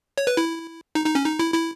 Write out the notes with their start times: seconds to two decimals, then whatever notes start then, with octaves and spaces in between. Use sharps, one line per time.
0.18 C#5
0.27 B4
0.37 E4
0.95 D#4
1.06 D#4
1.15 C#4
1.25 D#4
1.39 E4
1.54 E4